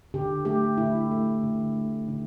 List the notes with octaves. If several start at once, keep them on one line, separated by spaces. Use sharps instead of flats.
D3 G4
A3 G4
D3 E4
A3
D3
A3
D3